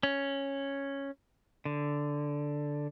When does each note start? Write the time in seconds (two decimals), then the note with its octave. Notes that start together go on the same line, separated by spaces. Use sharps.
0.03 C#4
1.65 D3